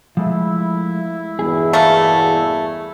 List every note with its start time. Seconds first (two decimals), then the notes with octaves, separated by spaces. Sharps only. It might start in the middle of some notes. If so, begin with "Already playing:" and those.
0.17 F3 G#3 A3 E4
1.39 E2 G2 B2 G#4
1.73 A3 A#3